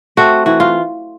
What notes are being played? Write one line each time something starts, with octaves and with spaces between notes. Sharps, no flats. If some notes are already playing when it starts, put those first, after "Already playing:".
A3 C4 F#4
E3 F#4
F4